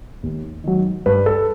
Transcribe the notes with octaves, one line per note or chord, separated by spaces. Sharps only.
D#2
D#3 F#3
G2 B4
A4